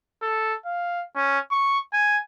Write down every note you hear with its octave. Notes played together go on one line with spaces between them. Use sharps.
A4
F5
C#4
C#6
G#5